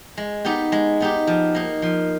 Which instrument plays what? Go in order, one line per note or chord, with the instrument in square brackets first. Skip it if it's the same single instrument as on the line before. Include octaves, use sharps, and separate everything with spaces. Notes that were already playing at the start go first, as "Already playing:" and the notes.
[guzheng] G#3
B3 D#4 G4
G#3
B3 D#4 G4
F3
A#3 D#4
F3